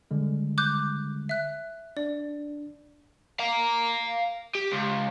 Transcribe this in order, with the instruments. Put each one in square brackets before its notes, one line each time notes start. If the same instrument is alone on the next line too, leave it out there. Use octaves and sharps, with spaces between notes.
[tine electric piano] D3 G3 G#3
[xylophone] D6 F#6 G6
E5 F#6
[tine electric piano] D4 [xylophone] D5
[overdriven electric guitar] F5 A#5
G4
C#2